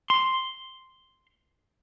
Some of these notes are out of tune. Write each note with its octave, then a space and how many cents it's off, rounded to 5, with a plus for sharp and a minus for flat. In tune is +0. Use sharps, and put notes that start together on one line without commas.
C6 +0